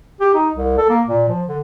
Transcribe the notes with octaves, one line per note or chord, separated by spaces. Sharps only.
G4
D#4
C2
A4
A#3
A#2
F3
D3